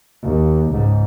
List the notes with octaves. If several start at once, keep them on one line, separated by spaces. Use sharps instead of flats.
D#2
C#2 G#2